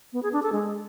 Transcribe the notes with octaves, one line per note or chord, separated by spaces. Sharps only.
B3
G#4
D4
A4
G#3